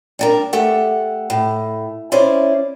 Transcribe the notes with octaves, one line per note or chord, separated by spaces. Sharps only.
G3 D4 A#4
A3 G4 F#5
A2
C#4 E4 C5 D5